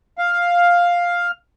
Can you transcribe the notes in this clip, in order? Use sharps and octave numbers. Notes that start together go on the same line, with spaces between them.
F5